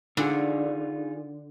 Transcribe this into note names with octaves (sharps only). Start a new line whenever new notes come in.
D3 D#4 F4 G#4